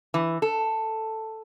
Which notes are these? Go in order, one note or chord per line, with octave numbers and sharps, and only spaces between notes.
E3
A4